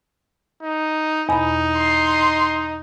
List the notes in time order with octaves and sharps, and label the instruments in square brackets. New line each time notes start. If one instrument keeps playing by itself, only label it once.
[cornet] D#4
[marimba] E2 B2 B5 [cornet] D#4
[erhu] C6